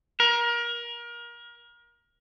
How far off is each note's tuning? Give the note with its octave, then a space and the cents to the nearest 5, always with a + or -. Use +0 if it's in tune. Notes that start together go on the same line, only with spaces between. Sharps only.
A#4 +30